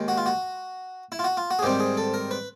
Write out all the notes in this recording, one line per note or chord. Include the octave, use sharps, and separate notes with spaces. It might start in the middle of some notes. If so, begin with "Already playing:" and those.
Already playing: D#2 D#3 G#3
F#4
F4
F#4
E4
F4
F#4
F4
F#4
G#4
G#2 D#3 G3 C4 G4
G#4
A4
A#4
B4